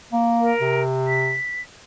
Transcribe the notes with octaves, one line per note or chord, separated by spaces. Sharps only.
A#3
A#4
C3
B6